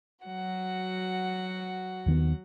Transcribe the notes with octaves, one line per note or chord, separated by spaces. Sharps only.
F#3 F#4 F#5
D#2 D#3 B3